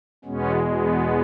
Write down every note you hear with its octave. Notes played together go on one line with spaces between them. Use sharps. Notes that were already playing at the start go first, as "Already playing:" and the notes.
E2 B2 G#3 B3 C#4
B3